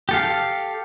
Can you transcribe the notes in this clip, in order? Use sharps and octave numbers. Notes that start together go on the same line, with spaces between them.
G4 A4 F5